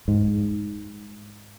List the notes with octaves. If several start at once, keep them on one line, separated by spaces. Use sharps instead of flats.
G#2